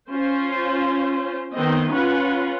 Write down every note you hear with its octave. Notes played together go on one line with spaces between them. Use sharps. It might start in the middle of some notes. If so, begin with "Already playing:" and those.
C#4 F4 C5
D#3 B3 C4 D#5
C#4 F4 B4 F#5